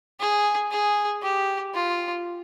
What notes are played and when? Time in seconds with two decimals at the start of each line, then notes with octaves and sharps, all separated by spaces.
0.20 G#4
0.71 G#4
1.23 G4
1.75 F4